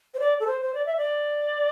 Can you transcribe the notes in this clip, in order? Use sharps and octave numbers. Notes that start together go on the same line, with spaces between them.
C5
D5
A4
C5
C5
D5
E5
D5